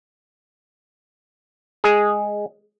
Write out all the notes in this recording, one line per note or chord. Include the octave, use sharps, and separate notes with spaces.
G#3 G#4